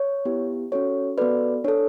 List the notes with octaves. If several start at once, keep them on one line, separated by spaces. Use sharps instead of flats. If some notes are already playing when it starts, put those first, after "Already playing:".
Already playing: C#5
B3 E4 G4
C#4 F#4 A4 C#5
B3 F#4 A4 B4 D5
D4 A4 C#5